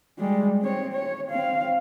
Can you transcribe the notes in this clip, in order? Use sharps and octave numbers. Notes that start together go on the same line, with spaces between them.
G3 G#3
C4 C#5
C#5
C4 F5